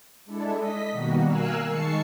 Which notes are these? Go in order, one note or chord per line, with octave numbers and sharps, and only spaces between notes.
G#3 D4 E4 A4
D#5 B6
B2 D#3 G3 A#3 F#4
A#4 F5 G#5 E6 F#6
D#3 G#3 A5 C#6 C7 C#7